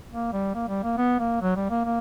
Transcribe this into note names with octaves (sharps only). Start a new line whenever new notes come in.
A#3
G3
A#3
G3
A#3
B3
A#3
F#3
G3
A#3
A#3